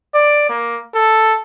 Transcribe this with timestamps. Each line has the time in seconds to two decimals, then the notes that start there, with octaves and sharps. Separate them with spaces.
0.14 D5
0.49 A#3
0.94 A4